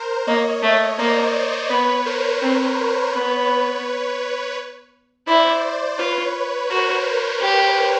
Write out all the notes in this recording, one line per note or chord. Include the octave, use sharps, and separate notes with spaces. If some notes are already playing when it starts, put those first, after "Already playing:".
Already playing: A#4 C5
A#3 C#5 D#5
A3
A#3 C5 D5
B3 B4 C#5
A#4 C5
C4 B4 C#5
B3
E4 C5 D5
F4 B4 C#5
F#4 A#4 C5
G4